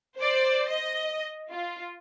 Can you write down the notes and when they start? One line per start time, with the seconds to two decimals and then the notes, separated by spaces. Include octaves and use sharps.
0.17 C5 D5
0.68 D#5
1.50 F4